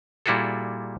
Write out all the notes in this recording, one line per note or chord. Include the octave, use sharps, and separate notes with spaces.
A#2 G3 E4 F#4 G#4 A4